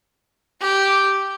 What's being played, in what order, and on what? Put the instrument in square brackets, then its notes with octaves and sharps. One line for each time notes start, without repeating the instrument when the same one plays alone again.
[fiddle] G4